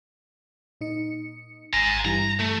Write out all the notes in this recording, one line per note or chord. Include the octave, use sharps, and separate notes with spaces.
A#2 D#4 C#7
G#1 G#5 A#5
G2 E3 G3 A#5
A3